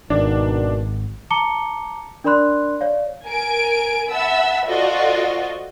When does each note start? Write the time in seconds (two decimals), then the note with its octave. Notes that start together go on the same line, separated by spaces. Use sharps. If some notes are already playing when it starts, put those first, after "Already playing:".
0.10 G#1 B2 D#3 D4
1.30 A5 A#5 D6 C#7 G7
2.24 D4 A#4 D5 B5 C6 F#6
2.81 C#5 D5 F5
3.26 A#4 G#5 D7
4.11 E5 F#5 A5 B5 E6
4.67 F4 F#4 A4 C5 D5 D#5